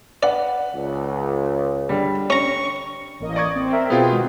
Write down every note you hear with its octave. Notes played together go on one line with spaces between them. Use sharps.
B4 D5 F#5
C#2
D3 G3
C#4 A#5 C#6
A1 A#3 D#5
D5 C#6 G#6
C4
A#4 E5
B2 B3 F4 G#4 G5
D#3 G#3 F#4